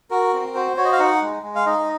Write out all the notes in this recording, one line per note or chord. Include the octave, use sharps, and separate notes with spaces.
F#4 A#4
C4
F#4 C5
F#4 C#5
D#5
F5
D#4 F#5
G#3
G#3
F5
D#4 D#5